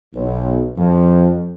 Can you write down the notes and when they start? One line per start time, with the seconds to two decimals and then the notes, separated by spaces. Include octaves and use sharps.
0.14 B1
0.77 F2